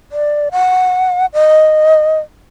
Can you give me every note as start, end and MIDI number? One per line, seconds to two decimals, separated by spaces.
0.12 0.49 74
0.52 1.26 78
1.34 2.19 75